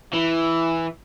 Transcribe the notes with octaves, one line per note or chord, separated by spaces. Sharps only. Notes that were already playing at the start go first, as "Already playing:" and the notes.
E3 E4